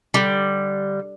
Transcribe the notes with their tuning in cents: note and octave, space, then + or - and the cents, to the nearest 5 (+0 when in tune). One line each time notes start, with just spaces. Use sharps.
D3 +0 G3 +0